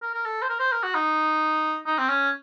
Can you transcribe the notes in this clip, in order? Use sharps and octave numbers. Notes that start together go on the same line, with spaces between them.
A#4
A#4
A4
C5
A#4
C5
A#4
F#4
D#4
D#4
C4
C#4